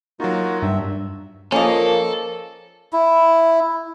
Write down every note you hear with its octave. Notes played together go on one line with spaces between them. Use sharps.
F#3 A#3 D#4 F4 F#4
G2 E5
F3 A#3 C#4 A4 D#5
E4